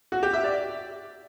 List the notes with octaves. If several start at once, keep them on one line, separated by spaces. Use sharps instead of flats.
F#4
G4
E5
D5